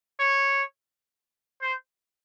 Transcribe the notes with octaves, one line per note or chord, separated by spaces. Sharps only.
C#5
C5